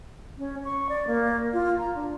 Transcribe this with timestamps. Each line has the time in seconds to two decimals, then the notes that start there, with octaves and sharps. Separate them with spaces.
0.38 C#4
0.64 C#6
0.89 D5
1.07 A#3
1.53 F4
1.79 A#5
1.95 D4